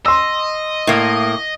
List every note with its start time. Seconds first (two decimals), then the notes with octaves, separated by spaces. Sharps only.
0.06 D#5 C6 E6
0.87 A2 A#3